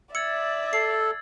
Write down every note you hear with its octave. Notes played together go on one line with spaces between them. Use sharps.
D5 E5 E6 G#6 A6 C#7
A4 C7